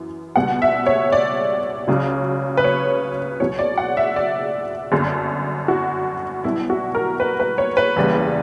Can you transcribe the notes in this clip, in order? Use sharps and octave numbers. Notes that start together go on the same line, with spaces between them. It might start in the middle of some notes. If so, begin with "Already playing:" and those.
Already playing: F#2 E3
C#2 B2 G3 F#5
E5
C#5
D5
C#2 C#3 F#3
B4
C#5
C#2 B2 F#3 C#5
D5
F#5
E5
D5
G1 F#2 D3
F#4
B1 B2 G3 E4
F#4
A#4
B4
B4
C#5
B4
F#1 E2 C#3 G3